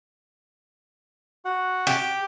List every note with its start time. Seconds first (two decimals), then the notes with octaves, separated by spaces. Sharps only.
1.45 F#4 F#5
1.87 G4